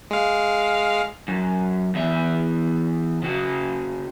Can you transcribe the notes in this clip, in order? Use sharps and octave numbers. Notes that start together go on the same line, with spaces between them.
G#3 F5
F#2
E2 E5
C#3 F#4